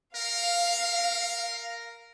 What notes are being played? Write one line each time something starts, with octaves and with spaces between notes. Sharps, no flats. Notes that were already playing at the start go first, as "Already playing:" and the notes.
A#4 F5